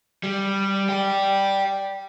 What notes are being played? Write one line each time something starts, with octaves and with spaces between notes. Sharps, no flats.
G3
D5 G5